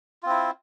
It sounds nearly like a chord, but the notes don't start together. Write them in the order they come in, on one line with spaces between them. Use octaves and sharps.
F4 C4 E4